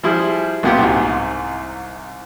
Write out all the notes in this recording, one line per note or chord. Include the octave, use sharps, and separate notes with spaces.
F3 G3 E4 G#4
B1 A#2 B3 F4 G4
C2 G#2